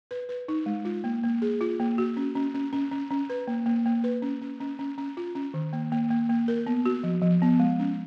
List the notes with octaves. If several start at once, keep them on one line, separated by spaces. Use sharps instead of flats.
B4
B4
D#4
G#3
F4
A#3
A#3
G#4
F4
A#3
F#4
C#4
C#4
C#4
C#4
C#4
C#4
B4
A#3
A#3
A#3
B4
C#4
C#4
C#4
C#4
C#4
F4
C#4
D#3
A#3
A#3
A#3
A#3
A#4
B3
F#4
F3
F3
B3
G#3
C#4